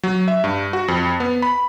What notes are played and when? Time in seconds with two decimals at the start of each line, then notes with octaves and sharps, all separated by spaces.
0.03 F#3
0.28 E5
0.44 G2
0.73 F#4
0.88 F2
1.20 B3
1.42 B5